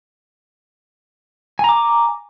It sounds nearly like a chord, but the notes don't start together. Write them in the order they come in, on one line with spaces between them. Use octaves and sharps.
G#5 A#5 D6